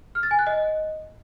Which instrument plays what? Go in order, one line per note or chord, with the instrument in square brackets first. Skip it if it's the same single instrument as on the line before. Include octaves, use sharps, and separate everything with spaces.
[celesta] F6
A6
G#5
F#6
D#5